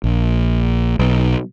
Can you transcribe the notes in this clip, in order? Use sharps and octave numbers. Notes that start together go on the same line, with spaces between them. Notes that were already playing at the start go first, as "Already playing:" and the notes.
A#1
B1